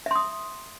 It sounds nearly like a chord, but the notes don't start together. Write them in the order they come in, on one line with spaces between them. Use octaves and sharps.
E5 C6 D#6